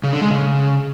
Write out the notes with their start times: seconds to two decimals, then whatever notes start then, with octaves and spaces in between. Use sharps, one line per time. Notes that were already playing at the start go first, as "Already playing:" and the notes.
0.04 C#3
0.12 D3
0.21 G#3
0.30 C#3